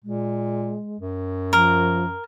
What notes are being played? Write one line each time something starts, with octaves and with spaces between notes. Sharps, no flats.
A#2 G#3
F#2
F3 A#4